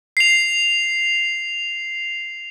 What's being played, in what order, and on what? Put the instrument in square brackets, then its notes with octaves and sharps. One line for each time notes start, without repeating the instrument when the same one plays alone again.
[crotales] C7 F7